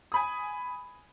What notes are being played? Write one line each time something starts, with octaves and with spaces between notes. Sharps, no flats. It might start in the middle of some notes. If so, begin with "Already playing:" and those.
G#5 B5 D#6